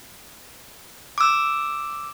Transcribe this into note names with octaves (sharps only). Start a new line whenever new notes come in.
D6 E6